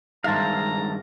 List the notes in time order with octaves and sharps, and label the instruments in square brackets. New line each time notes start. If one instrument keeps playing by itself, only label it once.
[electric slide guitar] G2 D#3 G#3 [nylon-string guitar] C5 E5 [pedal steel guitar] F5 A5 [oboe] A#5